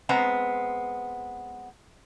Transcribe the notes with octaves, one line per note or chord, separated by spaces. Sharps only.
G#3 B3 C4 A#5